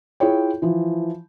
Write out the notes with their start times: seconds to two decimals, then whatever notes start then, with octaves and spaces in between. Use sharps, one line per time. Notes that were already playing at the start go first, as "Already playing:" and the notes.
0.20 E4 F4 G#4 C#5 G5
0.62 E3 F3